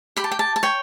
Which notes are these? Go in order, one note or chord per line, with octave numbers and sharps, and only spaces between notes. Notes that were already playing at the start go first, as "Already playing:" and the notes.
G4 B5
A5
G5
A5
A5
C#5 G5